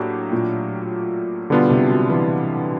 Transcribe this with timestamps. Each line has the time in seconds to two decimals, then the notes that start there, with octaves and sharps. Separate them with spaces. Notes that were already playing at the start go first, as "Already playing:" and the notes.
Already playing: A2 F#3 A#3 D4 G4
0.32 A#2
1.50 B2 D3 G3 B3 D4 F4
1.70 C3
1.90 F#3
2.10 E3